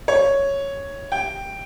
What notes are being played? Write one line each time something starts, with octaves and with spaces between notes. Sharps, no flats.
C#5
G5